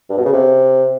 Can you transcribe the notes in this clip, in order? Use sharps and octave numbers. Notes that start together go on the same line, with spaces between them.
G2
B2
C#3
C3